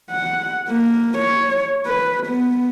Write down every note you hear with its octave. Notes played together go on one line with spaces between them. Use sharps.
F#5
A#3
C#5
B4
B3